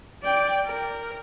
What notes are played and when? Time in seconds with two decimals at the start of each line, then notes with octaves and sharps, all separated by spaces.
0.23 D5 G5
0.66 A#4